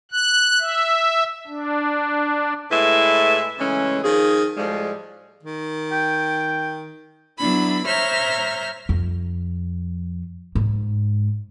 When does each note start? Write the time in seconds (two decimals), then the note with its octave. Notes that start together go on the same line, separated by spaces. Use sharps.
0.12 F#6
0.60 E5
1.47 D4
2.71 A2 G#3 E4 B4 E5
3.58 C#3 E3 G#3 A3 C#4
4.03 D#3 F3 G#4
4.57 A2 F3 G3 G#3
5.43 D#3
5.92 G5
7.38 F#3 B3 D4 E4 B5
7.87 C5 C#5 E5 A#5 F6 G6
8.89 F2
10.55 G#2